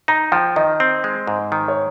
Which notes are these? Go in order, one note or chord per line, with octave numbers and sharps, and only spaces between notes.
D#4 A#5
F3 G5
D#3 D#5
C4
G#3
G#2
D#3
C#5